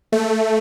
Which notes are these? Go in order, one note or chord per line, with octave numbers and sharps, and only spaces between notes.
A3